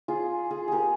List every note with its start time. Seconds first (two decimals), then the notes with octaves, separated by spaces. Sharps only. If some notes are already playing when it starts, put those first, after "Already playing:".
0.08 F4 G#4
0.51 F4 G#4
0.68 G4 G#4 A#4